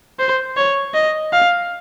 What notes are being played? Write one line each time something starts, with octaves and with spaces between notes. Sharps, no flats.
C5
C#5
D#5
F5